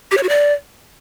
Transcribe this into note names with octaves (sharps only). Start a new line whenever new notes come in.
G4
C#5
F#4
D5